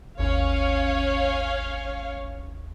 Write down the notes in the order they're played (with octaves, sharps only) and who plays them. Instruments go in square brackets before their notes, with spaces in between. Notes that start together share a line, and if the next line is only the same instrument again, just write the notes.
[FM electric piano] G#1 D#2 [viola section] C#4 C#5 F5